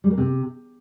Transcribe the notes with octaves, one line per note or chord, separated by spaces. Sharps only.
G3
A#3
C3